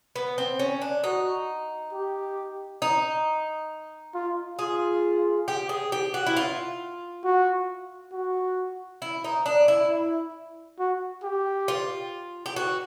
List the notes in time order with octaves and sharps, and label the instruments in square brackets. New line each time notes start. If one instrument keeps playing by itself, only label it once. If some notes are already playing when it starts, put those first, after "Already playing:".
[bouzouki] B3
C4
C#4
D4
[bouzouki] D#4 [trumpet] F#4
[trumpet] G4
[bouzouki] D#4
[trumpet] F4
[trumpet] F4 [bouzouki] G#4
[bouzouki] G4
G#4
G4
F#4
E4
F4
[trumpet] F#4
F#4
[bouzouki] E4
D#4
D4
E4
[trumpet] E4
F#4
G4
[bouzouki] F4
G4
F#4